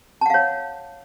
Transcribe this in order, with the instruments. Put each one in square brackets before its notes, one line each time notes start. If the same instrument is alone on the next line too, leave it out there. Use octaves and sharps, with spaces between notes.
[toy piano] A5
F#5
F5
C#5